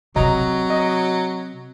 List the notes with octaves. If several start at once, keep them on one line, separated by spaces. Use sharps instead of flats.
C3 F#3 C4 D#5 A#5
D#5